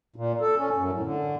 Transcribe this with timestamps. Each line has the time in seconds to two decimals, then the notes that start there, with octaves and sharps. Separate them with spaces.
0.16 A#2
0.41 A4
0.58 C#4
0.75 F#2
0.92 A2
1.03 D3